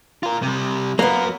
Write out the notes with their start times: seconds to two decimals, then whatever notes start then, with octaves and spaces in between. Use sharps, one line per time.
0.23 F4 A#4
0.43 C3 G3
0.99 F#3 A#3 B3 A#4